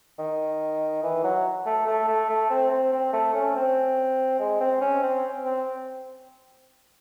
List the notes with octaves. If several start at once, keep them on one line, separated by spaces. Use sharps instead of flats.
D#3
E3
F#3
A3
A3
A3
A3
C4
C4
C4
A3
C#4
C4
G#3
C4
C#4
C4
C4